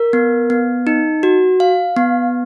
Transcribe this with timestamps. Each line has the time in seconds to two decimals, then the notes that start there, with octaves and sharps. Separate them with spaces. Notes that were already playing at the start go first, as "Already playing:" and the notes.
Already playing: A#4
0.13 B3
0.50 B3
0.87 D#4
1.23 F#4
1.60 F5
1.97 B3